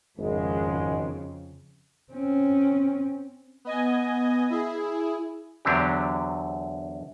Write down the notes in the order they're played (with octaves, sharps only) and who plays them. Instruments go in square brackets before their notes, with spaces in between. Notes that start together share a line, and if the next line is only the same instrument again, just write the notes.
[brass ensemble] G#1 G#3 [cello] F2 C#3
[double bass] C4 C#4
[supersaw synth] B3 D#5 G#5
E4 G#4
[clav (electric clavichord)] E2 D3 F#3 C4 D4 G4